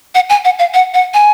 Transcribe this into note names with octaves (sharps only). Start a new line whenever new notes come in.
F#5
G#5
F#5
F5
F#5
F#5
G#5